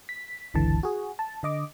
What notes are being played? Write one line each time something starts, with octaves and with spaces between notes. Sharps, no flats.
B6
G1 C#2 D3 E3 A5
F#4 G#4
A5
D3 D#5 D6